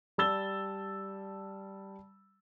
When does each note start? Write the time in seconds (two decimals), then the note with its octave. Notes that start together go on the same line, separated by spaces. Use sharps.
0.18 G3 A5 E6 A6 G7